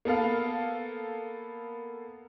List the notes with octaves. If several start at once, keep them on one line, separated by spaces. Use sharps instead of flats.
A#3 B3 A4 F5